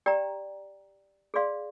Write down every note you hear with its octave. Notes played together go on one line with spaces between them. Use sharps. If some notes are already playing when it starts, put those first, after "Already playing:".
G4 D5 G5 A#5
G#4 D5 F5 C6